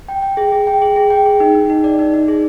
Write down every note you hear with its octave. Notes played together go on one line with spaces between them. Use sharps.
G5
G5
G#4
G#4
G5
G#4
G#4
G5
G#4
D#4
D#4
D#4
D5
D#4
D#4
G#4